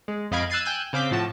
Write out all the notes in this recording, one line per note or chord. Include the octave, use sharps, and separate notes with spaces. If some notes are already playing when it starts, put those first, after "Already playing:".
G#3
F2 D#5 F5 B5 G#6 D7
E6 F#6 G#6 A6 C7 D#7
G5 G#5 E6 F#6 G6
C#3 C4 F5 D6 G6 B6
A2 F3 F#4 A5